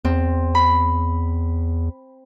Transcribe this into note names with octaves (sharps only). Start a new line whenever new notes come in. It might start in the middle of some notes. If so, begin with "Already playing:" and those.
E2 C4
B5